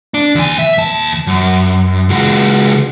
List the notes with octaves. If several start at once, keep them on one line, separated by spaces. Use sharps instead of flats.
D4
D#2 G#5
E5
D#2 A5
F#2
C#2 F#4